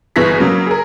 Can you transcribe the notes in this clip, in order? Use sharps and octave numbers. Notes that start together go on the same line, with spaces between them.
G1 B2 E3 G#4 A#6 B6
C#3 F#3 A#3
G#4 A#4